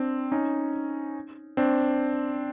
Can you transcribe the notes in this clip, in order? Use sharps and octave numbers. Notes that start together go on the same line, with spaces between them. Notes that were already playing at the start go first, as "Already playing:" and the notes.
Already playing: C4 D4
C#4 D#4
C4 D4